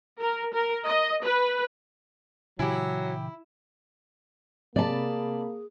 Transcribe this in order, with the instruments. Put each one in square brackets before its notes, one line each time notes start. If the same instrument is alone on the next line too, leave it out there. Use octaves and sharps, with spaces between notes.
[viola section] A#4
A#4
D#5
B4
[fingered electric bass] A#2 C#3 E3 [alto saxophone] F#3 [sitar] E4 [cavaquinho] G4 G#5
[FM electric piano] C3 B5 [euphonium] A#3 [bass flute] G#4 [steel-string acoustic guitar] D5 A5